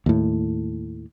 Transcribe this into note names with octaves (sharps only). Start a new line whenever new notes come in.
D#2 A2